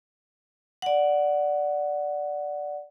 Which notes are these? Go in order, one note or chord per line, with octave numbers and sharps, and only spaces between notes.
D5 F#5